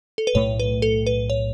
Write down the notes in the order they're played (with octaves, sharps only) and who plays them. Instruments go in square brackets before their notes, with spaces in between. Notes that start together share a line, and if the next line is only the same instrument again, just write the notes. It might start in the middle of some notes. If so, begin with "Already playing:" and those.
[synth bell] A4
B4
[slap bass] B1 A2 A3 [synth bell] C#5
[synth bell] B4
A4
B4
C#5